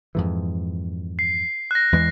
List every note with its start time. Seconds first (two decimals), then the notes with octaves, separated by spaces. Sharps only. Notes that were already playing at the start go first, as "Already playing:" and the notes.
0.15 F2 G#2 E3
1.19 C7
1.71 F#6 A#6
1.92 E2 E3 G#3